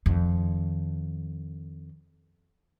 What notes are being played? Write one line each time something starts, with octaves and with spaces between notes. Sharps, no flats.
F2 D#3